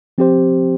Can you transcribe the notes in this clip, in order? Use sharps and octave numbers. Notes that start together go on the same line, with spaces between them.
F3 C4 G4 C5